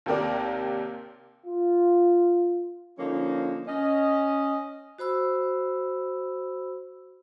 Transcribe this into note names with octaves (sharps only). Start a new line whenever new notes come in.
D#2 C3 G4 A#4 D5
F4
D3 F3 A#3 C#4 D#4
C#4 D#5
F#4 C5 B5 E6